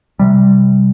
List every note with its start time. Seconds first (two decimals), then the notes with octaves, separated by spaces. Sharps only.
0.19 C3 G3